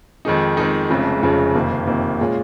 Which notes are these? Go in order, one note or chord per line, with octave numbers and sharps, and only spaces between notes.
F2 D#3 G#3 D#4
F2 D#3 G#3 D#4
F1 F2 C#3 F3 G#3
F1 F2 C#3 F3 G#3
F#1 F2 C3 D#3 A#3
F#1 F2 C3 D#3 A#3
A#2 G#3 C#4 F4